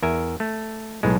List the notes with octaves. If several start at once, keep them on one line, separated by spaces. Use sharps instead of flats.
E2 A#4 E5 G#5
A3
B1 A2 G#3